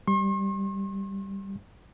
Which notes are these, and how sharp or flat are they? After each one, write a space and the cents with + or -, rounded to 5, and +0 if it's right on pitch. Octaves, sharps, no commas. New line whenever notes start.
G3 +0 C6 +45